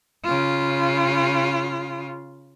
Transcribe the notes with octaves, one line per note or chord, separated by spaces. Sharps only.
C#3 F4